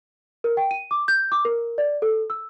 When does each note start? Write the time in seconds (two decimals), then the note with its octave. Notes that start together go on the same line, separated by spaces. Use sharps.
0.44 A#4
0.57 G5
0.71 D#7
0.91 D6
1.08 G6
1.32 D6
1.45 A#4
1.78 D5
2.02 A4
2.30 E6